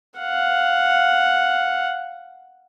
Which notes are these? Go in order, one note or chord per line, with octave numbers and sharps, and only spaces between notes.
F5 F#5